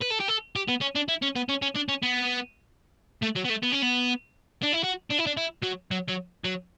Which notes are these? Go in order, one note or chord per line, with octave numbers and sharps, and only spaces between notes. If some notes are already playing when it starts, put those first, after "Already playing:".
B4
A4
G4
A4
G4
B3
C#4
D4
E4
C#4
B3
C#4
C#4
D4
C#4
B3
A3
F#3
B3
A3
B3
C#4
B3
D4
E4
F#4
D4
E4
D4
E4
F#3
F#3
F#3
F#3